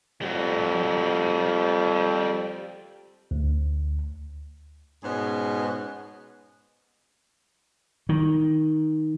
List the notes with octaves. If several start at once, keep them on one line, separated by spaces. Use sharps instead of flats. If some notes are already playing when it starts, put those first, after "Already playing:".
F2 G3 F#4
D2
G#2 B2 B3 C#4 G#4
D#3